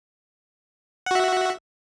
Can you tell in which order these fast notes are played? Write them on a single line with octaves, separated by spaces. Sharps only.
F#5 F#4 E5